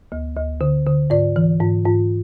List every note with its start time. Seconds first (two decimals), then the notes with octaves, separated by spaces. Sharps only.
0.12 D2
0.36 D2
0.61 D3
0.86 D3
1.10 G#2 D5
1.36 E3
1.61 G#2
1.85 G#2